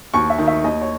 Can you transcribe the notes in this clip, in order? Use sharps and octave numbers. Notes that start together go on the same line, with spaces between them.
D#2 C#6
E5
D#3
E5
D#2 D#5
C#5